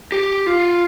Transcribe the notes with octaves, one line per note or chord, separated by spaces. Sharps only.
G4
F4